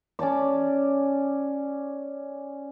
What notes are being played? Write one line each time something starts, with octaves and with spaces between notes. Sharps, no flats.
C#4 D5 A5 D6